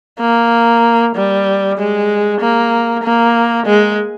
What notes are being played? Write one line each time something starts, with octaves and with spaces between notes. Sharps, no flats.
A#3
G3
G#3
A#3
A#3
G#3